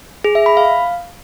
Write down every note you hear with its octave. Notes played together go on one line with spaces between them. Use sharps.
G#4
E5
B5
F5